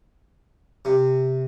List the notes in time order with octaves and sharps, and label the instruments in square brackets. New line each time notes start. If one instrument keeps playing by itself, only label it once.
[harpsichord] C3